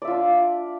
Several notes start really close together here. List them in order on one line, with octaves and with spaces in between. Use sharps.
D5 E5 F4 D4